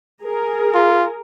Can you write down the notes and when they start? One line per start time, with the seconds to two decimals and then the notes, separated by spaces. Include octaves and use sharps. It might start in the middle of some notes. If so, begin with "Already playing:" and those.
0.23 G#4 A#4
0.74 F4